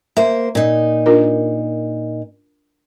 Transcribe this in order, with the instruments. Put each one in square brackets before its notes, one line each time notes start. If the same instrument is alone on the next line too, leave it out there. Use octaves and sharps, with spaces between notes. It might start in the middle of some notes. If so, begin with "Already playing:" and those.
[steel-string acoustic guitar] A#3 C5 [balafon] E5
[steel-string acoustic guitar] A#2 D#4
[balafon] D4 F4 A#4